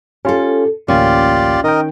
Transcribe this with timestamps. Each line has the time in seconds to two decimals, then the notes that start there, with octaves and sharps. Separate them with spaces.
0.25 C#4 F4 G4 A4
0.88 A1 D2 A#3 C#4 F4 G4 D5
1.64 D#3 A#4 D#5 G5